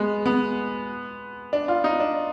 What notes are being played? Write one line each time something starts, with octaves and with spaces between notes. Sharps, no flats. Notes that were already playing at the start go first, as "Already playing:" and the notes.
Already playing: G#3 B3
B3
D4
F4
D#4
D4